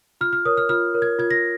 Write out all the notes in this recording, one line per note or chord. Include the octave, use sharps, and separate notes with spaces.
F4 F6
F6
A#4 C#5 D#6
F6
F4 F6
A#4 C#5
G#6
F4 G#6
A#6